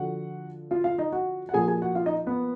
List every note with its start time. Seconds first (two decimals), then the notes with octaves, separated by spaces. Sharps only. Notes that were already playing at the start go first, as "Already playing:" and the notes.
Already playing: D3 F3 F#4 F#5
0.71 F4 F5
0.84 F4 F5
0.98 D#4 D#5
1.12 F#4 F#5
1.49 F#5
1.54 A#2 F3 G#4 G#5
1.67 G#4 G#5
1.82 F#4 F#5
1.95 F4 F5
2.06 D#4 D#5
2.27 B3 B4